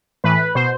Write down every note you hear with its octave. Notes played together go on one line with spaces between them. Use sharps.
A2 E3 B4
B2 C5